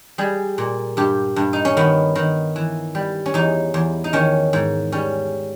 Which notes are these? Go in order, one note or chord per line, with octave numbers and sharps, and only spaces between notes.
G3 G#4
A#2
G2 G4
G2
D#4
C#4
D#3 B3
D#3
E3
G3
C#4
E2 D#4
E2
D#4
D#3 C#4
G#2
G3 C#4